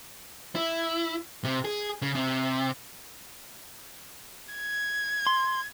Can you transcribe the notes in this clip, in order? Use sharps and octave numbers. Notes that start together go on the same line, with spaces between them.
E4
C3
G#4
C#3
C3
G#6
C6